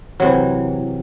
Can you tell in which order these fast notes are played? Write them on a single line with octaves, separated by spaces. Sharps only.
F#3 C3 E3